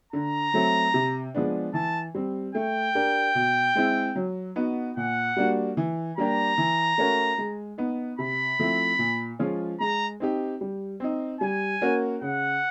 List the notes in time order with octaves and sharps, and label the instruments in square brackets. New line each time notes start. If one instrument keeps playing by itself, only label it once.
[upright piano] D3 [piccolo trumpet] A#5
[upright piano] F#3 A3 C4
C3
F3 G#3 B3 D4
[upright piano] E3 [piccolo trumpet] A5
[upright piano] G3 C4
[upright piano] A3 [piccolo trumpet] G5
[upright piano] D4 G4 A#4
B2
G#3 C4 E4
F#3
B3 D#4 F#4
[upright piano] A#2 [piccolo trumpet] F#5
[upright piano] G3 A#3 D4 F#4
E3
[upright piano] G3 A#3 D4 G4 [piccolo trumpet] A#5
[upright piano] E3
A3 C#4 F#4 A#4
G#3
B3 D#4
[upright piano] C3 [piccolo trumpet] B5
[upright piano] F3 A3 C4 E4
A#2
F3 G#3 C#4 F4
[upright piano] G#3 [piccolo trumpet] A#5
[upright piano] C4 D#4 G4
G3
C4 D#4
[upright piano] G3 [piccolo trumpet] G#5
[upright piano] A#3 C#4 F#4 A#4
[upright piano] C#3 [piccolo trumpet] F#5